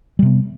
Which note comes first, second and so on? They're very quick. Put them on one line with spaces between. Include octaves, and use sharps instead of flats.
G3 C3 B3